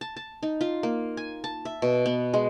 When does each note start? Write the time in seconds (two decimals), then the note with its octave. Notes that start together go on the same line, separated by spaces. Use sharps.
0.01 A5
0.16 A5
0.43 D#4
0.61 F4
0.83 A#3
1.17 G#5
1.44 A5
1.65 E5
1.82 B2
2.06 B3
2.34 G#3